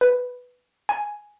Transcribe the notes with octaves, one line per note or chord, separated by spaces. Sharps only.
B4
G#5